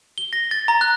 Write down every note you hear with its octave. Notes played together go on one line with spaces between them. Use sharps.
G7
A#6
A6
A#5
F#6